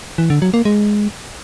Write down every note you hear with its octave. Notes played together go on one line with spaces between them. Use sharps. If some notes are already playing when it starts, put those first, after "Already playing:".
E3
D3
F#3
A#3
G#3